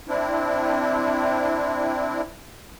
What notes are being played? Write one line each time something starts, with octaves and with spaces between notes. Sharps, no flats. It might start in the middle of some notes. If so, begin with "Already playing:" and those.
C4 D4 E4